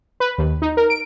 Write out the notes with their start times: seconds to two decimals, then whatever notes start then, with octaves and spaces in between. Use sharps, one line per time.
0.20 B4
0.38 D#2
0.62 D#4
0.77 A#4
0.90 D7